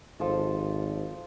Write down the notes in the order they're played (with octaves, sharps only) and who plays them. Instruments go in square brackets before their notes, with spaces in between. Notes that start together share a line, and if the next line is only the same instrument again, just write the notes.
[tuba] G#1 [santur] F3 A4 A5